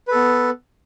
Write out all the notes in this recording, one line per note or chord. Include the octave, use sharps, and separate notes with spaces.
B3 A4 B4